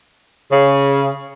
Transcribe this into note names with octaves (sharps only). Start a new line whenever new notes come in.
C#3